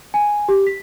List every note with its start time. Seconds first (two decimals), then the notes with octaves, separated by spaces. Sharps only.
0.14 G#5
0.49 G4
0.67 B6